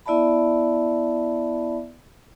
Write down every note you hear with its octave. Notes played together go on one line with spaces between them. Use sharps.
B3 E4 D5 E5 A5 B5